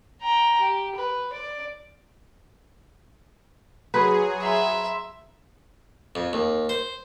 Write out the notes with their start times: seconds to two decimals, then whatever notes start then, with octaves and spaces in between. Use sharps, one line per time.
0.22 G5 A#5
0.60 G4
0.96 B4
1.33 D5
3.94 F#3 G#4 B4 B5 C6
4.43 E5 A#5 C6
6.15 F2
6.33 D#2
6.69 C5